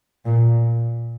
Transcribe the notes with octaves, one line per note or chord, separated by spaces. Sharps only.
A#2